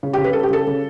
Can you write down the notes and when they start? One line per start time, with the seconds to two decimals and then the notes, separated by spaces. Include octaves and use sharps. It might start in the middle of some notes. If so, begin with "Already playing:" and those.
0.03 C#3
0.13 C#3 G4
0.24 B4
0.33 G3 A4
0.43 G4
0.50 C#3 A4
0.67 C#3